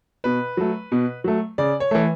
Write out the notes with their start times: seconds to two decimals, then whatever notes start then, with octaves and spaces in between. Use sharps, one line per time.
0.24 B2 B4
0.57 F#3 A3
0.92 B2
1.24 F#3 A3
1.58 C#3 D5
1.80 C#5
1.91 E3 A3